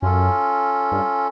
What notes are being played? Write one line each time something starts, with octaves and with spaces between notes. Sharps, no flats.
F#2 C#4 F4 A4
G2